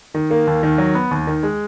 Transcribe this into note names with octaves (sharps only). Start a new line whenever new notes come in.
D#3
A#3
D#2
D#3
F#3
B3
D#2
D#3
G#3